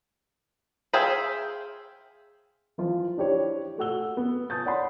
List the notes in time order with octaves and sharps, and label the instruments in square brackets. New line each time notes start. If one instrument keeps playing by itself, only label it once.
[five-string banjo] G#4 C5 E5 F5 G5
[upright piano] E3 F3 F4 C5
D4 E4 G4 C5 C#5
A3 F#4 F#5 E6 G7
B3
G#5 A5 D#6 G6 A6
C#5 D5 F#5 A5 B5 C6